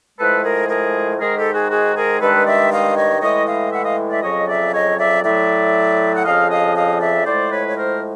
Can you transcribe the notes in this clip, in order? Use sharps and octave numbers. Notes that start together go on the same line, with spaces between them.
A2 F3 G#3 A4 B4
G#4 A#4
G#4 A#4
G#2 D#3 G#3 G#4 A#4
G4 A4
F#4 G#4
F#4 G#4
G#4 A#4
G2 D#3 G#3 A4 B4
D5 E5
D#5 F5
C#5 D#5
A2 E3 G#3 C#5 D#5
D#5 F5
E5 F#5
D#5 F5
D5 E5
F2 C#3 F#3 C#5 D#5
D5 E5
C#5 D#5
D5 E5
A2 F#3 D5 E5
F#5
F2 C#3 F3 D#5 F5
D#5 F5
D#5 F5
D5 E5
A2 F3 G#3 C5 D5
B4 C#5
C#5
A#4 C5